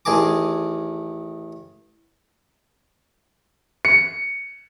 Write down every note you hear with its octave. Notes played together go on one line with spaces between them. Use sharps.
A1 D#3 G#4 A5 D6
C#7